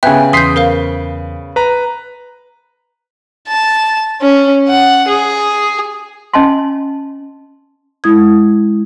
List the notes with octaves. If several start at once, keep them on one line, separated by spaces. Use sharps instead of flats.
C#3 B3 E5 G5 G#5 F#6
E2 C6 D#6 G6 B6 C7
A#4 C5 F5
B4 A#5
A5
C#4
F#5
G#4
C#4 D#5 G#5 A5 C6
G#3 E4 D#6 G#6